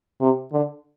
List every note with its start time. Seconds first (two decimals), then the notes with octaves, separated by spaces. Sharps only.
0.21 C3
0.52 D3